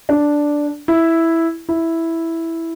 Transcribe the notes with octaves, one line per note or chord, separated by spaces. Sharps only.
D4
E4
E4